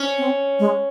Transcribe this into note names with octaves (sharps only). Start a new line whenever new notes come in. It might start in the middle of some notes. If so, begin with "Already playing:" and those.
Already playing: C#4
C4
G#3